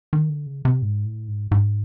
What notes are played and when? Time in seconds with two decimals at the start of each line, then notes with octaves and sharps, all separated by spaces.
0.13 D#3
0.30 D3
0.46 C#3
0.65 C3
0.82 G#2
1.05 A2
1.28 G#2
1.51 G#2